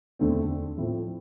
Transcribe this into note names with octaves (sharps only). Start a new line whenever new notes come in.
E1 D2 D3 A3 C4
A2 F3 A3 C4 E4